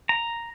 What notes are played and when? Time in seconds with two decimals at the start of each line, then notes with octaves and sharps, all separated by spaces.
0.09 A#5